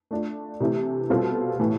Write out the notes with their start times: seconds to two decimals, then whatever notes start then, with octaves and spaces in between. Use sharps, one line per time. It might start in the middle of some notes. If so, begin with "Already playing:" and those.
0.11 A3 D4 F4
0.60 C3 E3 A3 E4
1.10 B2 G3 C4 F4 A4
1.59 A2 E3 A3